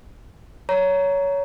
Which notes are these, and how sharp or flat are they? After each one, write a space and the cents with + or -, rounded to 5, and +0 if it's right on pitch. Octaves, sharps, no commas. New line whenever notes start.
C#5 +15 A#5 +0